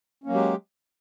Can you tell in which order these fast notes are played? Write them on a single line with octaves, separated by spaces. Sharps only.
C#4 A#3 F#3 G#3 G4